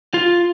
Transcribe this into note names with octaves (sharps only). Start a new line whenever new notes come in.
F4